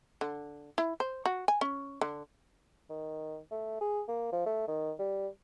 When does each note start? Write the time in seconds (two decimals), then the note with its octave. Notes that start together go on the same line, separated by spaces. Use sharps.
0.21 D3
0.78 E4
1.00 C5
1.26 F#4
1.48 G#5
1.61 C#4
2.01 D3
2.90 D#3
3.52 A3
3.81 G#4
4.09 A#3
4.33 F3
4.46 A3
4.68 D#3
4.99 G3